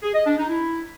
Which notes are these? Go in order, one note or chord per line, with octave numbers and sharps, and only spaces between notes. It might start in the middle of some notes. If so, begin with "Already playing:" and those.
G#4
D#5
D4
D#4
E4